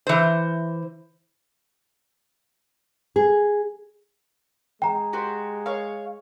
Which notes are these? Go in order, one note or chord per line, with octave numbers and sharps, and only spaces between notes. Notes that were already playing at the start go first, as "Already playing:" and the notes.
E3 C5
G#4
G#3 G5 A#5
F#4 G4 C5
C#5 F5